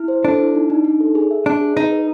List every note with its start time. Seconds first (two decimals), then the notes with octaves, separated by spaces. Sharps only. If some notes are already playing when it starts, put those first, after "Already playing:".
Already playing: E4
0.08 C5
0.24 D4 A4
0.39 E4
0.55 D#4
0.70 D#4
0.84 D#4
1.00 A4
1.15 G#4
1.31 E5
1.46 D4 E5
1.61 G#4
1.76 D#4 B4
1.92 B4